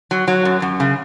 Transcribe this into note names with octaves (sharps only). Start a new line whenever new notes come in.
F#3
F#3
F#2
F#2
C#3